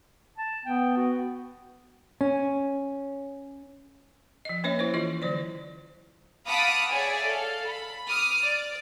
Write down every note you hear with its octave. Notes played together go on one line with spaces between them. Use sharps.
A5
B3 G5
F#4
C#4
F3 D#5
A#3 C#4 B4 C#5 D#5 E5
E4 B4 C5
E3 E4 F4 G#4 D#5
D3 F#3 C5 D5
F5 F#5 A5 B5 D6 D#6
G#4 C#5 D5 E5 F#5 G#5
A4 F5
B5
D6 D#6 F6
D5